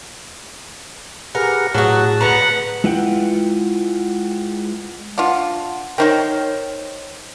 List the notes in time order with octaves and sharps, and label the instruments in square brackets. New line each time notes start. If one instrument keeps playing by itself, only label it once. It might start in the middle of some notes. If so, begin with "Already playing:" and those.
[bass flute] G4 [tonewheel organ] G#4 B4 F#5 [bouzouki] A#4
[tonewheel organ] A2 A5 [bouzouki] F#3 F#4 [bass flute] G#4
[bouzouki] D3 A#5 [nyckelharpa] B4 F#5
[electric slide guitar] G#3 E4 F4 B4 F#5 G5
[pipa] D4 F4 [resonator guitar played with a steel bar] F#5
[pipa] D#3 D#4 G5 [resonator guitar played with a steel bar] A#4 C5 C#5